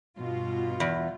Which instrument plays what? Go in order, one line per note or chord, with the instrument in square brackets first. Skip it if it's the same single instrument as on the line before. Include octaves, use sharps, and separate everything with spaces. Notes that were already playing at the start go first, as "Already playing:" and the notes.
[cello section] G2 B2 F4
[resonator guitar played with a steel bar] E2